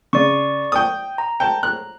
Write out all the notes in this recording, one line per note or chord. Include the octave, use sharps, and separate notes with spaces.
C#3 D5 C#6
G5 D#6
A#5
G5 A5
F#6